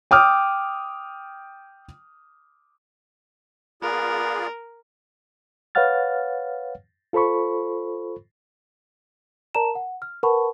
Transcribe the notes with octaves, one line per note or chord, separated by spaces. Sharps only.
G5 D6 D#6 F6
B3 F4 G#4 A#4 D5
B4 C#5 F5 F#5 F6 A6
F4 A4 C5 B5 C#6
A#4 D5 A5 A#5 E7
F#5
F6
A#4 B4 F#5 A5 B5 C#6